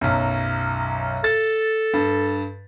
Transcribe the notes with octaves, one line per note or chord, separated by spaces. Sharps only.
B1 F#2
A4 A6
G2